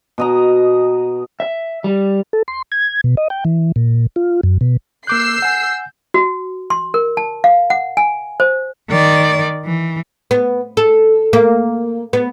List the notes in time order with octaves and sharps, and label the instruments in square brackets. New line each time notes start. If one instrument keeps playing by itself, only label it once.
[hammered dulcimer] B2 D#5 A#5
[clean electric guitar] E5
G3
[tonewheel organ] A4
C6
G#6
B2
D#5
G5
E3
A#2
F4
F#2
B2
[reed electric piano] A#3 D6 F#6 [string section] E6 C7 [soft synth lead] G6
[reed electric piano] F#5 G#5
[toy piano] F#4
C6
A#4
A5
F5
F#5
G#5
C5
[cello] D#3 D5
E3
[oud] B3
A4
A#3
B3